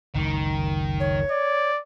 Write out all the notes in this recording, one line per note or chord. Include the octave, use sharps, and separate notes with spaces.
F#1 C#2 D#3
C#5
D5